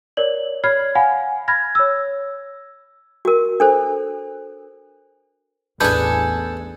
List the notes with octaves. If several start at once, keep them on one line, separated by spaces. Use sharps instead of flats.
A#4 C#5 D5 F#7
C#5 B5 F6 G#6 C7
F5 F#5 G#5 B5
B5 F6 G#6 A#6
C#5 E6
F#4 A#4
D4 A4 C5
A1 E2 D4 G#4 A4 B4 G#5 G6